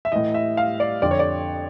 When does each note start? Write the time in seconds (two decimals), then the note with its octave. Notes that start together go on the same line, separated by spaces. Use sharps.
0.05 E5
0.12 A2 E3 D#5
0.34 E5
0.57 F5
0.80 D5
1.02 F2 D3 D5
1.11 C#5
1.19 D5